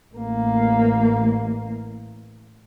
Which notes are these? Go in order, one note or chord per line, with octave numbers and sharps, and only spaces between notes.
A1 A#3